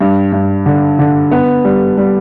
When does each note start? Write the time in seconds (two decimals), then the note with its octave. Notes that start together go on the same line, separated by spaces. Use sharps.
0.01 G2
0.32 G2
0.66 D3
0.99 D3
1.32 B3
1.64 G3
1.98 G3